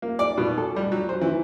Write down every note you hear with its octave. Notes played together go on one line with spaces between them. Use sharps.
A#3
D5
B2
A4
G3
F#3
C5
E3